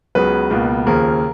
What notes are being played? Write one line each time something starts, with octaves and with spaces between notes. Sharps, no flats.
C#2 C#3 F#3 B3 B4
C#2 B2 A#3
D#2 C#3 F3 A#4